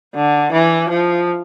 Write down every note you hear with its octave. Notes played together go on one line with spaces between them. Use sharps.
D3
E3
F3